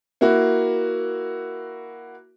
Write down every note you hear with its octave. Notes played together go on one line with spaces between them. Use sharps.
A#3 E4 F#4